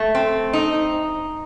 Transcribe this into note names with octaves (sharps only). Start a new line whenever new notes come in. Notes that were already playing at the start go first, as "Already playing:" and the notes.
Already playing: A3
C4
D#4